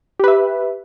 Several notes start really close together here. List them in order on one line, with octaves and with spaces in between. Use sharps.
G4 B4 E5